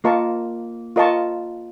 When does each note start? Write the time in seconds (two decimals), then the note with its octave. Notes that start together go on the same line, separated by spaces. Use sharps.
0.04 A#3 F4 A#4 D#5 A5 C#6
0.96 F4 A#4 D#5 A5 C#6